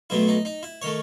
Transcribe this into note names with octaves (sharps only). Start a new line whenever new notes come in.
B1 B2 F#3 A3 E4
D#4
D#4
E4
D#3 A3 C#5